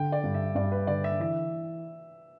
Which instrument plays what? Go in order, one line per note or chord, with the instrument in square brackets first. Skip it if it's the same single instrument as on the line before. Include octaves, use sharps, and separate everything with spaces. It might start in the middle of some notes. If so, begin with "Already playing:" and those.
Already playing: [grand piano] D3 [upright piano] G5
[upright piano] D5
[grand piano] G2
[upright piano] E5
[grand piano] G2 [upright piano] D5
[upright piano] B4
[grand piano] D3 [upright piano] D5
[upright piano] E5
[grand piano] E3 [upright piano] E5